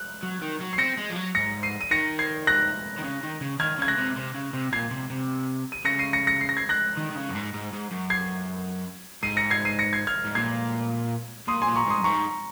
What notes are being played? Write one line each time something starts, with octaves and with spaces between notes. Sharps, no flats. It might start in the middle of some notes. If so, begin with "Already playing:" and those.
Already playing: F#6
F#3
D#3
F#3
C7
C4 A#6 C#7
G#3
F3
F#3
G#2 A#6 C#7
C7 D#7
D#7
D#3 A#6 C#7
G#6 C7
F#6 A#6
D#3
C#3
D#3
C#3
D#3 F6 G#6
C#3 G#6
F#6 A#6
C3
C3
C#3
C3
A#2 G#6 C7
C3
C3
D#7
C#3 A#6 C#7
C7 D#7
A#6 C#7
A#6 C#7
C7
A#6
G#6 C7
F#6 A#6
D#3
D#3
C#3
F#2
G#2
G#2
G#2
F#2
G#6 C7
G#2 C7 D#7
A#6 C#7
G#6 C7
C7 D#7
A#6 C#7
G#6 C7
F6 G#6
G#2
A#2 G#6 C7
A#2 C6 D#6
G#5 C6
A#2
A#5 C#6
G#2 C6 D#6
F#2
G#2 A#5 C#6